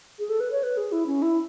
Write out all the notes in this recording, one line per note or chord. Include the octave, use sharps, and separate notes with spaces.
G#4
A4
B4
C#5
B4
G#4
E4
C#4
E4